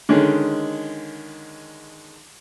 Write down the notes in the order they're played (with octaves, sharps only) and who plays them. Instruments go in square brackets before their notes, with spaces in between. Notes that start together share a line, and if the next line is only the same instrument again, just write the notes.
[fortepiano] D3 D#3 G#3 C#4